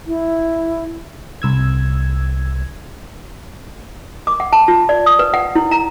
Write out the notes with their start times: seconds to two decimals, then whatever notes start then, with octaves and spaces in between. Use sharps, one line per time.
0.07 E4
1.42 C2 E6 G#6
4.27 D6
4.40 F#5
4.53 A5
4.68 F4
4.89 D5
5.06 D#6
5.19 B4
5.34 F#5
5.55 E4
5.71 A#5